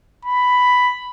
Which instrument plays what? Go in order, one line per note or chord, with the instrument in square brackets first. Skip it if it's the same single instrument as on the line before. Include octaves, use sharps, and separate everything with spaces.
[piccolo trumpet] B5